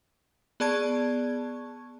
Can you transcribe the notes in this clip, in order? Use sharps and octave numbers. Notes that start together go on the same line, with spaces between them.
B3 G#4 D5 A5 C#6 G#6